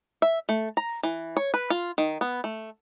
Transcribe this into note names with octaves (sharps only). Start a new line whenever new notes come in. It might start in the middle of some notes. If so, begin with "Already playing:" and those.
E5
A3
A#5
E3
C#5
B4
F4
D#3
B3
A3